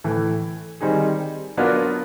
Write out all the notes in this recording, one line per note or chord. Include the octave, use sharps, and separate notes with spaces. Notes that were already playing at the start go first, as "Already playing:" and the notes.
A2 E3 A3
D#3 G3 C4 D#4 G#4
F#3 B3 D4 F4 A#4